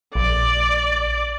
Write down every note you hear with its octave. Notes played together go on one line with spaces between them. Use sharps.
A#1 D5